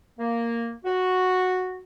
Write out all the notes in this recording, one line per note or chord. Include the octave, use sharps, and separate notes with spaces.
A#3
F#4